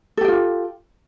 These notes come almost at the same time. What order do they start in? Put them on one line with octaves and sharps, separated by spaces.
A4 G4 G5 F4